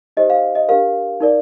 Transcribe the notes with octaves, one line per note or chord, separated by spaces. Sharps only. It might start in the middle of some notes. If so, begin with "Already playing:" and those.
D#4 G4 C5 D#5
F5
D#5
D4 G4 A#4 F5
D#4 A#4 D5